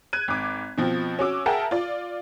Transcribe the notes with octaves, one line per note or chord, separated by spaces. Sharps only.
F#6 G#6 D#7
G#1 D6
B2 F3 C4
C#4 F#4 D6 E6
G#4 A#4 E5 F#5 G5 A5
F4 D5